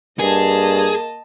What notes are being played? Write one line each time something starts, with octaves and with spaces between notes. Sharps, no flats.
G2 A#3 G#4 D#5 A5